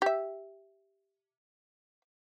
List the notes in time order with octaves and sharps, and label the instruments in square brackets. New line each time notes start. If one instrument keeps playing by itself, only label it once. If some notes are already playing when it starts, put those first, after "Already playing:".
[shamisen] G4 E5